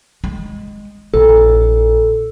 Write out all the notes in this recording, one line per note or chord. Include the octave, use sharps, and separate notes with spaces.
G#3
A#1 A4